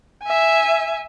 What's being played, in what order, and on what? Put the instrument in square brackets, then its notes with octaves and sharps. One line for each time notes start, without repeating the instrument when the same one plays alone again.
[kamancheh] E5 G#5